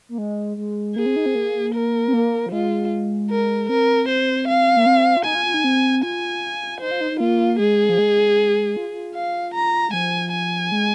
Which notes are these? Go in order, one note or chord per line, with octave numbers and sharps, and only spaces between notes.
A#3
G#3
G#3
A#3 G#4
C4
D#4
C4
A#3
A#4
C4
A#3
F3
G#3 F4
A#4
C4 A#4
C5
F5
A#3
C4
F4
D#4 G#5
F4
F4
D#4
C4
F4 G#5
D#4 C5
F4
D#4
D#4
A#3 F4
G#3 G#4
F3
G#3
F4
F4
F5
A#5
G#3
F3 G#5
G#5
G#3